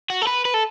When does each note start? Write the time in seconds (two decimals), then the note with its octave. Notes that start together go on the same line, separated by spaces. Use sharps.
0.10 F#4
0.22 A4
0.27 B4
0.45 B4
0.54 A4